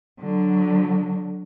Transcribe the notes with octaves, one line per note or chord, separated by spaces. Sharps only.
D3 F#3